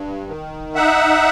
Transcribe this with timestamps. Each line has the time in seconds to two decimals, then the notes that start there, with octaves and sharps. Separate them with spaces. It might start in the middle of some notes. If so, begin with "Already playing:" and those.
Already playing: G2
0.29 D#3
0.75 D#4 E5 F#5